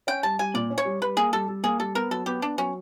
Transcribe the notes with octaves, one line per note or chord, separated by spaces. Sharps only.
C#4 G5
G3 A5
G3 G#5
A#2 D5
C#4
C#5
G3
G3 B4
A#3 G#4
G3 A4
G3
A#3 G#4
G3 A4
B3 A#4
F#3 A4
B3 G4
B3 D4
F#3 C#4